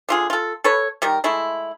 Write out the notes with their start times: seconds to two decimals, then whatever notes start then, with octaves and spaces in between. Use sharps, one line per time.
0.09 D3 F4 G#4
0.30 F4 A4
0.64 A4 B4 C#5
1.02 D#3 G3 A#4
1.24 G#3 A3 E4